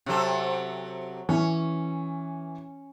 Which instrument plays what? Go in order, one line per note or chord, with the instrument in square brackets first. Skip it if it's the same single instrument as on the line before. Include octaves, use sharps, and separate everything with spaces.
[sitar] C3 F#3 A4
[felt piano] E3 [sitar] C#4